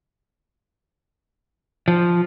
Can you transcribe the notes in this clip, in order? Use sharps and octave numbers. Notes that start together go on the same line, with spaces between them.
F3